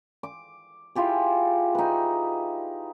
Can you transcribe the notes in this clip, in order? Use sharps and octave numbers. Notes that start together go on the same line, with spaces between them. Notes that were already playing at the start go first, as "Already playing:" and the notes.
D6
E4 F4 G4 G#4
D#4 B4